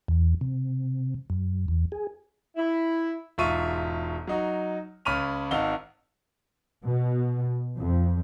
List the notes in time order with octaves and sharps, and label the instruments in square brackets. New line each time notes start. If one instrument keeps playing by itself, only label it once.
[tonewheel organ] E2
C3
F#2
E2
G#4
[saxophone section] E4
[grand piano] E1 G#2 F4 E5 C#6 D#7
F#3 D#4 F#4
C#2 C#4 B5 F6 D#7 F7
G#1 D#4 F5 F#5 E6 G7
[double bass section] B2
F2